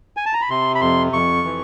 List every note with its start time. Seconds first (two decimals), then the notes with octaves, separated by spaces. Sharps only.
0.17 G#5
0.26 A5
0.33 A#5
0.41 B5
0.50 C3 C6
0.75 B5
0.81 F2 C6
1.13 F2 C#6
1.44 E3